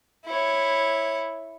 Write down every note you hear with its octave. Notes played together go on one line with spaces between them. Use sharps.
E4 C#5